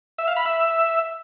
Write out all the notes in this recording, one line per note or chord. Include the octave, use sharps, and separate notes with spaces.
E5
F5
B5
E5